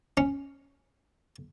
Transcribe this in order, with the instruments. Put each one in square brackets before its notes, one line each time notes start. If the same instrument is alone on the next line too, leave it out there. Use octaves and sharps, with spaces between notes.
[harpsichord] C#4